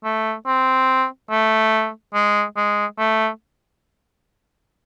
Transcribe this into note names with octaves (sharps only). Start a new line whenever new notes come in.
A3
C4
A3
G#3
G#3
A3